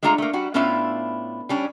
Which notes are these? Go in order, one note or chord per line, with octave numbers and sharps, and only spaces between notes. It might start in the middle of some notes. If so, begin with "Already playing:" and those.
G#3 A3 D4 F4 A#5
A3 A#3
G3 F#4
A2 B3 C#4 D4 F4 E5
G3 C#4 D4